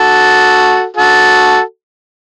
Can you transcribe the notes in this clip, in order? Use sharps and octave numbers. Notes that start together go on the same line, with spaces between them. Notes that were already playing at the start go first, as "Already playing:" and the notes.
Already playing: F#4 A4
F#4 A4